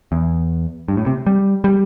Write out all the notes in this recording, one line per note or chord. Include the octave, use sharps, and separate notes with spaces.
E2
G2
A2
C3
G3
G3